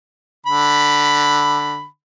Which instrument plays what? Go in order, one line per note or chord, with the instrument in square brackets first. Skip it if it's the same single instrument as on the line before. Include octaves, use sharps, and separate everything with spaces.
[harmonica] D3 B5